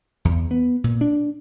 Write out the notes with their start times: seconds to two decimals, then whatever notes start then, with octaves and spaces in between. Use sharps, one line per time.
0.25 E2
0.51 B3
0.84 A#2
1.01 D4